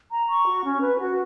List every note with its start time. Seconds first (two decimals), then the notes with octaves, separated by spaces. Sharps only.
0.11 A#5
0.29 C#6
0.46 F#4
0.64 C#4
0.81 B4
0.99 F#4